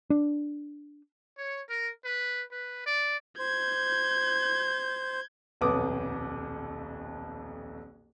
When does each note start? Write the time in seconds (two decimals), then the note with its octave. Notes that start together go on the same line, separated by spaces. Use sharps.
0.10 D4
1.38 C#5
1.69 A#4
2.04 B4
2.51 B4
2.85 D5
3.39 C5 G6 G#6
5.61 D#1 B1 F2 B3 D6 D#6